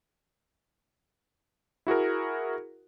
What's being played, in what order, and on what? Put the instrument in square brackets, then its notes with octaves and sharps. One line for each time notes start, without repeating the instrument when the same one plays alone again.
[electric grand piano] E4 F#4 G#4 A#4